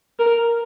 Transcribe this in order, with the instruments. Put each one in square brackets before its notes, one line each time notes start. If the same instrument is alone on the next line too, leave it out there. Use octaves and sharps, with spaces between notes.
[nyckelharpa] A#4